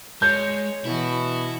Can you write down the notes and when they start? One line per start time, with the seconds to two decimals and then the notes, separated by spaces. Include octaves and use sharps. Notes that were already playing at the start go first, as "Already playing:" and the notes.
0.22 G#3 C#5 G6
0.85 B2 E3 E4 F#4